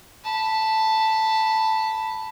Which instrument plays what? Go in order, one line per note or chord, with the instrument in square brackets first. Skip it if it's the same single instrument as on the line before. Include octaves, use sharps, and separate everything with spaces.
[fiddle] A5 B5